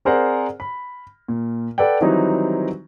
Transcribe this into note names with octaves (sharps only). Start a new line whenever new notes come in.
C4 G#4 A#4 C5 D5 F#5
B5
A#2
A4 B4 D5 F#5 G5
D#3 E3 F#3 G3 C4 D#4